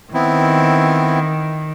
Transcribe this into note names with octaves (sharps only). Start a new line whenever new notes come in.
D#3 B3 C4 E4